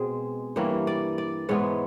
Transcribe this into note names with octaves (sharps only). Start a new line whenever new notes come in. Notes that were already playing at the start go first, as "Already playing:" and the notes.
Already playing: B2 G#3 C4 G#4
G2 E3 G3 A#3 C#5
D5
D5
G#2 E3 G#3 B3 C#5